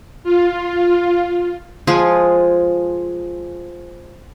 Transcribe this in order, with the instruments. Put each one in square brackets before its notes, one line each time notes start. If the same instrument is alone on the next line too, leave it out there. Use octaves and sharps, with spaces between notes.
[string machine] F4
[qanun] F3 G#3 F4 G#4